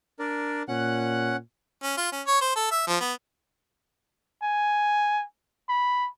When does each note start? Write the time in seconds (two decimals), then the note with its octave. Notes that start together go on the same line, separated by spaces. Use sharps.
0.19 D4 A#4 D5
0.68 A#2 C#4 F#5 F#6
1.83 C#4
1.97 F4
2.12 C#4
2.27 C#5
2.41 C5
2.56 A4
2.71 E5
2.87 F3
3.00 B3
4.42 G#5
5.69 B5